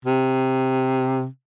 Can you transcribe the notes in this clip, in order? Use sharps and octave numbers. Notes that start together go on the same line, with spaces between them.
C3